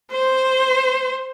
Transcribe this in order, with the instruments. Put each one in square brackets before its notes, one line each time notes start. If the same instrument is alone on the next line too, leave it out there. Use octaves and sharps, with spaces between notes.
[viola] C5